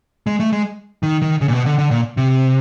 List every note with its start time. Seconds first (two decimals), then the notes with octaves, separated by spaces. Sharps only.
0.27 G#3
0.40 A3
0.53 G#3
1.03 D#3
1.22 D#3
1.41 C#3
1.48 A#2
1.53 B2
1.66 D3
1.79 D3
1.91 A#2
2.17 C3